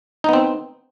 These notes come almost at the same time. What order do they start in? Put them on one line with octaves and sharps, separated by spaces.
D#4 B3 C4